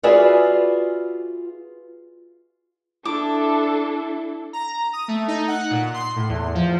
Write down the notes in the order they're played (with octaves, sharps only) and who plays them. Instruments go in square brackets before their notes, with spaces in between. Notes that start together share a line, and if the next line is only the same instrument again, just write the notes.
[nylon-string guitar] F4 F#4 G#4 B4 D5 E5
[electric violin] D4 A4 [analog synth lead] E4 [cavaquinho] D6
[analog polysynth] A#5
D#6
A3
D#4
F#5
A#2
C6
A2
E2
F3